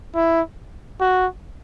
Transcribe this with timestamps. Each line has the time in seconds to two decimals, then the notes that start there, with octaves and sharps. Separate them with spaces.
0.15 E4
1.01 F#4